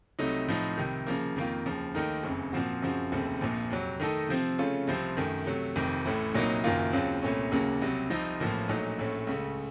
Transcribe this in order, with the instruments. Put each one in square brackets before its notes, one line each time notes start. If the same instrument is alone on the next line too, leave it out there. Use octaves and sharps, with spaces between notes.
[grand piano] C2 C3 F#3 A3 D#4
A2 F3 C4 D#4
C2 C3 D#3
C#3 F3 A#3
F2 D#3 A#3 F4
D#2 C#3 F3
D#2 D#3 A3 D#4 A#4
F#1 F2 C#3
A#2 F3 C4 F#4
F#2 C#3 F3 C4 F#4
F1 D#2 C#3 A3 C4
A#1 A#2 F3
F2 C3 F#3
D#3 A3 D#4 A4 D#5
C3 F3 C4
C#3 A3 C#4 F4
C2 C3 F3 C4
F#2 D#3 A3
C3 F#3 A3
F1 F2 D#3
A1 A2 A3
C2 A#2 F#3 A#3 D#4
F#1 F#2 D#3 A#3 F4
D#2 C#3 F#3 C4 F4
C2 A#2 A3 C#4
D#2 C#3 F#3 A#3
C2 C3 F#3
C2 C3 F3 C4 D#4
A1 A2 F3 A#3
A#1 A#2 F#3 A3 D#4
A#1 A2 A3 C#4
C#2 C#3 A3